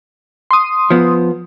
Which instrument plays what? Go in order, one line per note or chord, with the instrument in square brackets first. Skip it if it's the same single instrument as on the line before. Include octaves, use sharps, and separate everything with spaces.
[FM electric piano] C6 D#6
[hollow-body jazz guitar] F3 B3